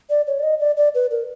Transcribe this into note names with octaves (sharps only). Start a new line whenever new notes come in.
D5
C#5
D5
D#5
D5
D5
B4
A#4